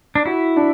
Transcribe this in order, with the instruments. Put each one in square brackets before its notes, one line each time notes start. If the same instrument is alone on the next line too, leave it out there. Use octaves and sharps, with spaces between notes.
[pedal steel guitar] D4
[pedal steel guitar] E4 [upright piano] F#4
[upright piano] D4